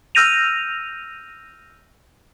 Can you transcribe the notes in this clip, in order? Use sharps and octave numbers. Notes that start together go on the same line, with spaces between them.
E6 F6 G6 A#6 D#7 F7